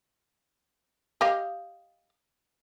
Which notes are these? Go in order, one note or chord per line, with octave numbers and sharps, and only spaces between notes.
G4 D#5 F5